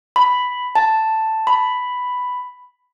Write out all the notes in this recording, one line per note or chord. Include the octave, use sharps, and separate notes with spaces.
B5
A5
B5